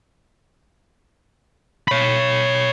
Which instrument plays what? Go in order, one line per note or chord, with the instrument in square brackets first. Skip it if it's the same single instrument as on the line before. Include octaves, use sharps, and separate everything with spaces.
[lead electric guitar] C#5 B5